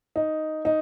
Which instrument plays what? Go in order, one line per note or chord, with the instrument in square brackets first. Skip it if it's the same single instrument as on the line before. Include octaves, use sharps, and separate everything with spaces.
[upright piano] D#4
D#4